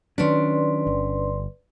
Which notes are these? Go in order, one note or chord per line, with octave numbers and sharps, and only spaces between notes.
D#3 F#3 C#4 D4 B4 D5 C6
G1